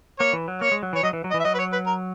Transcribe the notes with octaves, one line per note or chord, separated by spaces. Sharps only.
A#3 C#5
E3
F#3
A#3 C#5
G#3
F#3
E3 C#5
F#3 D#5
E3
F#3
D#5
E3
E5
F#3 D#5
B4
C#5
B4
A#4